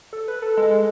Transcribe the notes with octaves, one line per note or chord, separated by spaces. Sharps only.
A4
B4
A4
G#3 A4